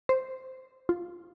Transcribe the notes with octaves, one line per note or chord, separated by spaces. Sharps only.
C5
F4